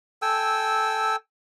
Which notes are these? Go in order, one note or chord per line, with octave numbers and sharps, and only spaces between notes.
A4 G5 G#5 E6